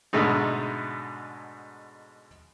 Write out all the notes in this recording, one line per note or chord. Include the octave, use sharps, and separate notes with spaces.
G#2 B2 D3 G#3 A3 D#4